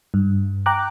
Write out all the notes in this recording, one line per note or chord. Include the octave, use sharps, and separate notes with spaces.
G2
G5 A#5 D6 F#6